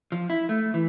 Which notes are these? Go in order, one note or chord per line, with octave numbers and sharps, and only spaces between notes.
F3
E4
A3
E3